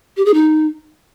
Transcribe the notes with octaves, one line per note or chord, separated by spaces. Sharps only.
G4
G#4
D#4